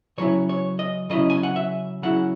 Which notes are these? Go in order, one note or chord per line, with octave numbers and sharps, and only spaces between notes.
C#3 F#3 C#4 E4 C#5
C#5
D#5
C#3 F#3 C#4 E4 D#5
G#5
F#5
E5
C#3 F#3 C#4 E4 F#5